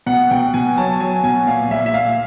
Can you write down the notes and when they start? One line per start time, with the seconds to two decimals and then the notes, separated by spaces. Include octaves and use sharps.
0.06 B2 F#5
0.31 B2 G5
0.54 B2 G#5
0.77 F#3 A5
1.00 F#3 G#5
1.24 B2 G#5
1.47 A#2 F5
1.71 A#2 E5
1.86 E5
1.94 A#2 F5